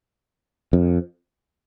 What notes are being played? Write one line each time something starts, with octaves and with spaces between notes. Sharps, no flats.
F2